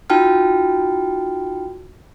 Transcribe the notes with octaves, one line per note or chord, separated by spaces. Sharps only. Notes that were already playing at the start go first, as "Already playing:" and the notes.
D#4 F4 F#4 G5 A5 F6